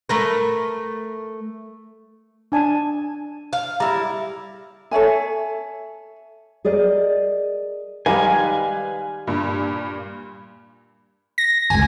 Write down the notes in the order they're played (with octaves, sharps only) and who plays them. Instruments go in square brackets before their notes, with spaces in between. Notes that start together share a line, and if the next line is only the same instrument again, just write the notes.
[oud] A3 A#4 B4
[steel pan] D4 G#5 A5
[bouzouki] F5
[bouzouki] G3 E4 [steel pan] A#5
[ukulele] A4 C#5 E5 G#5
[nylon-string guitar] G#4 A#4 D5 D#5
[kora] D#3 G3 G#3 [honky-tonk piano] B4 F5 [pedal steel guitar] G#5
[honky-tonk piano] G2 A#2
[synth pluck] A#6
[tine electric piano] G1 C#2 [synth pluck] G#5